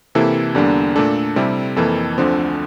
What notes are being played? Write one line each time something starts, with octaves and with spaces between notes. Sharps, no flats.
C3 E3 A#3 E4 A4
E2 D3 G3 A#3 D4
A#2 A3 D4 A4
C3 G3 C4 E4
F2 E3 A#3 A4
D2 D3 F3 C4